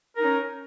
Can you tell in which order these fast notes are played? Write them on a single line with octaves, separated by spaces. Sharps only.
A#4 D#4 C#4